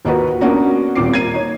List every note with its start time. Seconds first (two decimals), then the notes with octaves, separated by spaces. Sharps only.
0.05 D#2 A#3 D#4 F4 F#4 B4
0.41 A#3 B3 C#4 D4 F#4 A#4
0.95 D#1 A#2 C4 D6 C7
1.13 A#3 G#6 C7 D#7
1.34 D#4 C#5